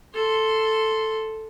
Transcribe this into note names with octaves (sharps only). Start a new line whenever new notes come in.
A4 C6